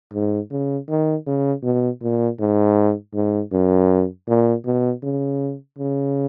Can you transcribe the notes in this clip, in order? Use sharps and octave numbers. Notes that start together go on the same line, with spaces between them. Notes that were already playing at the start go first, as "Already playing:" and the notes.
G#2
C#3
D#3
C#3
B2
A#2
G#2
G#2
F#2
A#2
B2
C#3
C#3